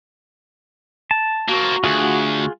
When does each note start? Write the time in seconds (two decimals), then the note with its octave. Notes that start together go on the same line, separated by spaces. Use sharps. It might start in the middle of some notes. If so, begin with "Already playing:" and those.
1.11 A5
1.49 A#3 C4 F#4
1.84 D2 F4 G#4 F#5